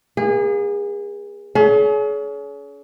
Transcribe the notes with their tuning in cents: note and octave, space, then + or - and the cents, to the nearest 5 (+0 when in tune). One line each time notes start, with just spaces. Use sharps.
A#3 +40 G#4 -30
C#4 +35 G#4 +40